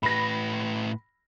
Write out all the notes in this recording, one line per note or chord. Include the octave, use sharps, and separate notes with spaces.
A2 B4 B5 A#6